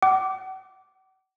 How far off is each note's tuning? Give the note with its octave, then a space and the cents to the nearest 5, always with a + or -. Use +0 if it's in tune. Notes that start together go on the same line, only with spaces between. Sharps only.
F#5 +40 D6 -10